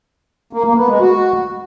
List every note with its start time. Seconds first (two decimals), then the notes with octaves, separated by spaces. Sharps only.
0.53 A#3
0.65 A#3
0.77 B3
0.89 G#3
1.01 F#4